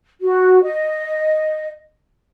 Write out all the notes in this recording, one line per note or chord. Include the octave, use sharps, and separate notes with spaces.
F#4
D#5